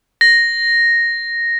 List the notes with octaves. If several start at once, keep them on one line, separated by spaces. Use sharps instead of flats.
A#6